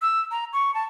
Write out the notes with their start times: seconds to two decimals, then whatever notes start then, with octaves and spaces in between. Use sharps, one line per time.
0.02 E6
0.31 A#5
0.53 C#6
0.75 A5